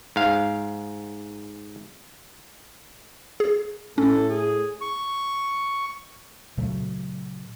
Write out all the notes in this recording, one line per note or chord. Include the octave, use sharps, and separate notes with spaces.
G#2 F5
G#4
A2 C#4 A4
G#4
C#6
A#2 C#3 F#3 A3